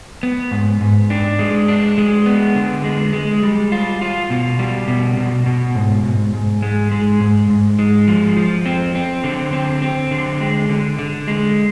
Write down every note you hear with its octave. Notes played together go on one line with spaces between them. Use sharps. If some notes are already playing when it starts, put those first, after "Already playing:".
B3
G#2
G#2
D4
G#3
D4
G#3
B3
D3
G#3
G#3
G3
F4
F4
B2
G3
B2
B2
B2
G#2
G#2
G#2
G#3
G#3
G#2
G#2
G#3
F3
F3
C4
C4
D3
C4
C4
D3
G#3
D3
D3
G#3